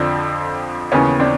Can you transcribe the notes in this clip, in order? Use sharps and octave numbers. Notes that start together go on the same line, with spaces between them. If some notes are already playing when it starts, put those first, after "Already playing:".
Already playing: F2 D3 F3 C4 D4
D#2 C#3 E3 B3 C#4
C4 D4